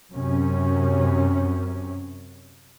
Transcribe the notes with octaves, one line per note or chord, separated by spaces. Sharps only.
F#2 C3 C#4